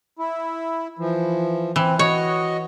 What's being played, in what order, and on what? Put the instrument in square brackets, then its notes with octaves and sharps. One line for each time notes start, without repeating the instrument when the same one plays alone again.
[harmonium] E4
E3 F3
[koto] E3 [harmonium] C4
[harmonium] F#4 D#5 [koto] C#5